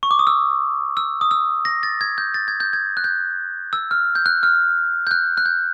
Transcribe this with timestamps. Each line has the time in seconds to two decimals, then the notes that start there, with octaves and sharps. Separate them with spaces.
0.03 C#6
0.11 D6
0.19 D#6
0.27 E6
0.97 E6
1.21 D#6
1.31 E6
1.65 A#6
1.83 A6
2.01 G#6
2.18 G6
2.34 A6
2.48 G#6
2.60 G6
2.73 G#6
2.97 F#6
3.04 G6
3.73 E6
3.91 F6
4.15 G6
4.26 F#6
4.43 F6
5.07 G6
5.11 F#6
5.37 F#6
5.46 G6